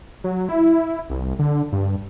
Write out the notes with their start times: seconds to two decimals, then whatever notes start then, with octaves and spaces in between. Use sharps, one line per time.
0.24 F#3
0.49 E4
1.10 C2
1.39 D3
1.72 G2